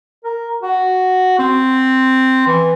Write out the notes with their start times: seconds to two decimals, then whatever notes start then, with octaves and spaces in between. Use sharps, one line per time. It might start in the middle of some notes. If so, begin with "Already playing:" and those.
0.24 A#4
0.63 F#4
1.39 C4
2.47 E3